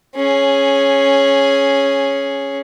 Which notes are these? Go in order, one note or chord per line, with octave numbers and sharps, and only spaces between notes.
C#4 G#4